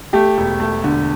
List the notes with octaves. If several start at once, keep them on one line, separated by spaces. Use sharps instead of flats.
A3 G4
E1
A3
D3